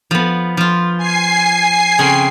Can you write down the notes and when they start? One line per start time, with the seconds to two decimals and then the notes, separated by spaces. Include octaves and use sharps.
0.11 F3 B3
0.57 F3 F4
0.97 G#5 C7
1.99 C#3 C4